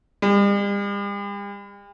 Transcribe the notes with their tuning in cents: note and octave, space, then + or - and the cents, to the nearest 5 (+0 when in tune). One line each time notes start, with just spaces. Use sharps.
G3 +45